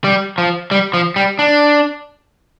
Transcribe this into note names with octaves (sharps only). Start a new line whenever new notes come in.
G3
F3
G3
F3
G3
D4